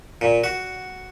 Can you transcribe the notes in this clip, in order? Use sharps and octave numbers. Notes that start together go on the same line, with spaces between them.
A#2
F#4